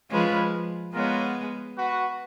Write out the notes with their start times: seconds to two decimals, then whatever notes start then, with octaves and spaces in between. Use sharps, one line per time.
0.10 F3 G#3 C#4 F4 B4
0.94 G#3 B3 F4 A#4 C#5 F#5
1.77 F#4 B4 F#5